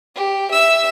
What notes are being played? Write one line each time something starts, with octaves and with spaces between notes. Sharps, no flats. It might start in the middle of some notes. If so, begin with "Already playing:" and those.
G4
E5 E6